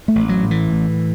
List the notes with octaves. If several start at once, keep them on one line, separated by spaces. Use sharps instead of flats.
A3
A1
F#3
A2
E3
A2